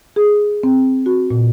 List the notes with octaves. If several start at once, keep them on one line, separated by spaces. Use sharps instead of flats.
G#4
C4
F#4
A#2